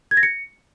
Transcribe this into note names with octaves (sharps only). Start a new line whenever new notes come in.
G#6
A#6
C#7